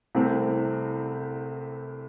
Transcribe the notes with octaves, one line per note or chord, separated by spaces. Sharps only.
C2 C3 E3 A3 C4